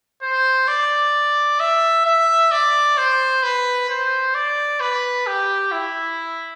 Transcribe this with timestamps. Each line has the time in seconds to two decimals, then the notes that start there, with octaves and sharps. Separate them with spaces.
0.22 C5
0.68 D5
1.60 E5
2.05 E5
2.51 D5
2.97 C5
3.43 B4
3.89 C5
4.34 D5
4.80 B4
5.27 G4
5.72 E4